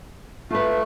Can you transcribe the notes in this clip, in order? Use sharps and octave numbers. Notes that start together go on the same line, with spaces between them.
A3 F4 B4